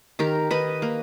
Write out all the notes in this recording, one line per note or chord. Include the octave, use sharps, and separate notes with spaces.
D#3 G4 A#4
D#3 B4 D#5
A#3